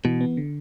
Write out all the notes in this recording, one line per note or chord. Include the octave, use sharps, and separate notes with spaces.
B2 E3
B3
D3